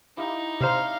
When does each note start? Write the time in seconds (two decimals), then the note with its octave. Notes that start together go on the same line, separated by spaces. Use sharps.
0.17 D#4 E4 G4 F5
0.61 C3 D4 C5 F5 A#5